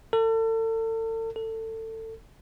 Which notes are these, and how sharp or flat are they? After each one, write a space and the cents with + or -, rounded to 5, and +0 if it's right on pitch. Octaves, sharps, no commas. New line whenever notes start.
A4 +40
A4 +25